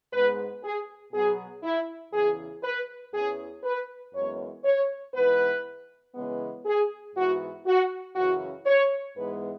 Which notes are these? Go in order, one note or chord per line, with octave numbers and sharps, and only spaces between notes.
G#2 G#3 B3 B4
G#4
B2 F#3 B3 G#4
E4
E2 C#3 E3 G#4
B4
E2 E3 C#4 G#4
B4
F#2 E3 G#3 B3 C#5
C#5
G#2 E3 B3 B4
C#3 E3 G#3 B3
G#4
G#2 E3 B3 F#4
F#4
F#2 C#3 E3 C#4 F#4
C#5
G#2 E3 G#3 B3 B4